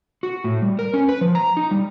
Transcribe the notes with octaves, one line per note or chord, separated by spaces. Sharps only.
F#4
A2
G3
A#4
C#4
B4
F3
A#5
D#4
G3